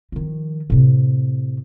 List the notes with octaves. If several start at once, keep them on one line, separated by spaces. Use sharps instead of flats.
D#3 F3
A2 C3